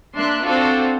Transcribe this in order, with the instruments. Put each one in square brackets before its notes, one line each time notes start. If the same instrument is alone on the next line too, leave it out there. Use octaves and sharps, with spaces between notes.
[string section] A#3 D4 E5 C6 F#6
C4 D4 F4 F#4 A4 C5